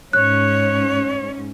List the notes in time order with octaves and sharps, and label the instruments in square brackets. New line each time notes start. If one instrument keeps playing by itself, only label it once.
[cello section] G#2 C#4 [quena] C#5 [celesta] F#6